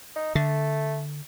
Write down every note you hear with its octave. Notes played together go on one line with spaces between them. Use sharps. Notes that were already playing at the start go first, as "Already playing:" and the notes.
D#4
D3 A3